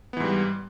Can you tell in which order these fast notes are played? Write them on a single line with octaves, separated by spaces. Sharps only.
B3 E3 G#2 G3